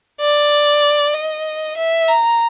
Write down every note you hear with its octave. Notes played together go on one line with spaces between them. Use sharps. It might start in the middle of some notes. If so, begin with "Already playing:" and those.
D5
D#5
E5
A#5